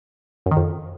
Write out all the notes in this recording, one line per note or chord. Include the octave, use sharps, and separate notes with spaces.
F#2
D#3
F2